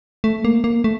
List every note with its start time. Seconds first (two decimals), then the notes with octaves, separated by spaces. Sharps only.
0.24 A3
0.45 A#3
0.64 A#3
0.84 A3